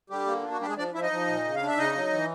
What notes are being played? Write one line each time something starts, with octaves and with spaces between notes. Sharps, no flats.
D3 G3 G4
A#3
D4 F4
F#4
G3 D4 G4
G#3 G#4
F3 D4 D5
F3 E4 E5
D#4 D#5
F3
A#2
C#3
F5
D4
E5
C#3 D#4 D#5
F#3
E3